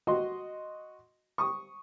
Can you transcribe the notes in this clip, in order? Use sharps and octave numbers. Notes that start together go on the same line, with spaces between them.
F#4 D#5 C6
C#6 D#6